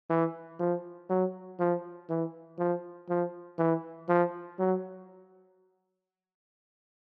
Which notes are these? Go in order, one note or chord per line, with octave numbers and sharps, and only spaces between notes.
E3
F3
F#3
F3
E3
F3
F3
E3
F3
F#3